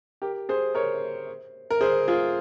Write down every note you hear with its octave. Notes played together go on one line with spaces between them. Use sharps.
G4 A#4
G#4 C5
A#4 C#5
A#4
G#4 C5
F4 G#4